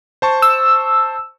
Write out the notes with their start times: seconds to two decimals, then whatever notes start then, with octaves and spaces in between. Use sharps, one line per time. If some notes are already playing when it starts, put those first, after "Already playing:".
0.22 C5 A5 C#6
0.42 E6